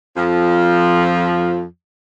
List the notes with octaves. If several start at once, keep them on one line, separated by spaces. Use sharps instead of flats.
F2 F3